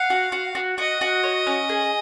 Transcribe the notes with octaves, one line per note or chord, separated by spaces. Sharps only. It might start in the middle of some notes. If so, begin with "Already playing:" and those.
Already playing: F5 F#5
F#4
F#4
F#4
F#4 D#5
F#4
C#5
C#4
G#4